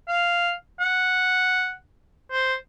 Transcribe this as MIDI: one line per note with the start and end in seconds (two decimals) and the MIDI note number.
0.08 0.53 77
0.80 1.73 78
2.31 2.54 72